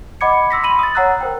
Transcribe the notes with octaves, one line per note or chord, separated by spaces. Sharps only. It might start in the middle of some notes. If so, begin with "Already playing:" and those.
D#5 F#5 B5 D6 G#6 C#7
C6 E6 A#6 B6
B5 C6 D#7 F#7
D#6 A6
C#5 F#5 A#5 E6 F#6
A#4 C5 G5